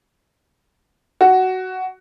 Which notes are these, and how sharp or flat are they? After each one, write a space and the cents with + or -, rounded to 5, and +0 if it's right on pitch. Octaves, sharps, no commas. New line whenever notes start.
F#4 +10